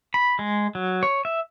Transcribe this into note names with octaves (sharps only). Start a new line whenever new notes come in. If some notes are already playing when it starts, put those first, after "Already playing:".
B5
G#3
F#3
C#5
E5